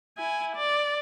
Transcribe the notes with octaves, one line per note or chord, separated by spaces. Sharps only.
E4 G#5
D5